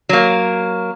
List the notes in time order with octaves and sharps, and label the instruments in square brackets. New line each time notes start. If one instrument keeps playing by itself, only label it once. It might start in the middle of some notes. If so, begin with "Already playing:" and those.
[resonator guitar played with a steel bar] F#3 A#3